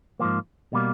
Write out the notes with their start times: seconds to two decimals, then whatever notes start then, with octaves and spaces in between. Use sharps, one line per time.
0.19 G#2 F3 A#3
0.73 B2 G3 A#3